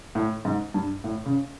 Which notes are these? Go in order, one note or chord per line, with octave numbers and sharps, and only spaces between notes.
A2
G#2
G2
A2
C#3